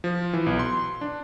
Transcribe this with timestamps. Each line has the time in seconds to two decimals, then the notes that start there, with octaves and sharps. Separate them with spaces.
0.04 F3
0.33 E3
0.46 B1
0.59 C6
1.01 D4